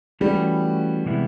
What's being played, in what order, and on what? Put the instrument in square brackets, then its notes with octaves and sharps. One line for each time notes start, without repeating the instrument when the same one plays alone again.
[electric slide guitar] E3 A3 C#4 F#4 B4 [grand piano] G3
[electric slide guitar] C3 E3 G#3 B3 E4